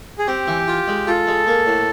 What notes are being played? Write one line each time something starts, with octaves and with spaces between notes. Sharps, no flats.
G#4
C4 G4
E3
F4
G#3
F4 A4
G#3
A#3
A2